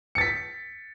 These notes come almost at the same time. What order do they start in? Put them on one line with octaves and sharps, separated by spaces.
C#7 A6 B6